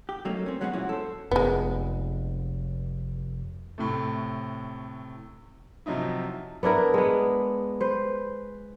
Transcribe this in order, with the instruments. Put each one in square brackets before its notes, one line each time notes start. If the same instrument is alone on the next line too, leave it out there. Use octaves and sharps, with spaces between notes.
[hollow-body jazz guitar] G4
F#3 A3 A#3 C#4 D#4
C4 C#4
F#3 G#3 B3 C#4 F4 F#4
B1 A#2 F3 C#4 E4 F#4
A4 C5
[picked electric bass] F1 [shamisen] G#3 B3
[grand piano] A2 C3 A3
C3 F3 F#3 D#4 E4
[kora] B3 D4 E4 A#4
G#3 B3
B4 C5